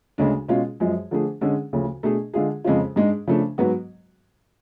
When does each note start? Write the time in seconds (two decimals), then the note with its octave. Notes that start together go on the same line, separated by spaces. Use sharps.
0.18 D2 C#3 G#3 D4
0.48 B2 G#3 C#4 F4
0.80 F#2 F3 G#3
1.11 D3 F3 A3 D4 G#4
1.41 D3 G#3 C#4 G#4
1.73 D2 C#3 F3
2.03 B2 A3 D4 G#4
2.34 D3 G#3 D4 F4 G#4
2.65 F2 C#3 G#3 C#4 F4
2.96 G#2 G#3 D4
3.27 C#3 F3 A3 D4
3.58 G#2 F#3 B3 F#4